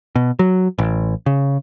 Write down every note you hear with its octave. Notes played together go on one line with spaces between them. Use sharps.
B2
F#3
A1
C#3